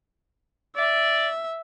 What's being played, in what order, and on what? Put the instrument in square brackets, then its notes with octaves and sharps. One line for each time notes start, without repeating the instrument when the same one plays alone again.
[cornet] D5 [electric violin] E5